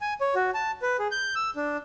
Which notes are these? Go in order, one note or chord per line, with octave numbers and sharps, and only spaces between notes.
G#5
C#5
F#4
A5
B4
G#4
G6
E6
D4